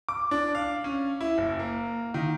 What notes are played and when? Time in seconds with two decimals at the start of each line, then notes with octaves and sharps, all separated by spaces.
0.09 D6
0.31 D4
0.55 F5
0.84 C#4
1.21 E4
1.38 F#1
1.59 A#3
2.14 D#3